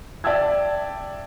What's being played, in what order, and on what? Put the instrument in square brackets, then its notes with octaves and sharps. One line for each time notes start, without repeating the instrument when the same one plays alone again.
[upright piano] D5 E5 G5 A5 E6 G#6